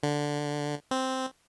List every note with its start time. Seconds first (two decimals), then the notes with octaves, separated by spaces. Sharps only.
0.03 D3
0.91 C4